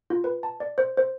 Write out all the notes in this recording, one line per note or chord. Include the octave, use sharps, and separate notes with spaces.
F4
B4
A5
D5
C5
C5